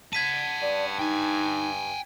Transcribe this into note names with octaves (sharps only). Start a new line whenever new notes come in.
F#5 A5 G#6 B6 D#7
G2 D5
D#4 G5 G#5